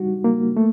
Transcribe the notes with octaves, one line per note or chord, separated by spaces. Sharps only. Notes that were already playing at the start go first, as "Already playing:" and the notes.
Already playing: G3 D#4 F#4
A#3
A3